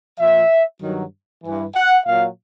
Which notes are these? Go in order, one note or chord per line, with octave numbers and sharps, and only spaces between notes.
A#2 F3 E5
G2 D#3 F#3
G2 E3
F#5
A#2 F#3 F5